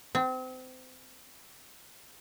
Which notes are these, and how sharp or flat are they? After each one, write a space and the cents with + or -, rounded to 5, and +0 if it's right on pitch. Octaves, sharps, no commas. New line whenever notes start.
C4 -30